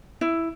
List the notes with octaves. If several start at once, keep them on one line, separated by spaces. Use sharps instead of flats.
E4